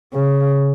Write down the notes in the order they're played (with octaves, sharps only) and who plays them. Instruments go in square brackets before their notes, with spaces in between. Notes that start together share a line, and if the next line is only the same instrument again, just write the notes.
[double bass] C#3